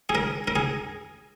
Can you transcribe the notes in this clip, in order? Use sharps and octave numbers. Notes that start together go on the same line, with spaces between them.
G#4
A#4
A#4
G#4